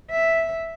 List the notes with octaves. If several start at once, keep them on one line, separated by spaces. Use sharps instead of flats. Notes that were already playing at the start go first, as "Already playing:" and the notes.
E5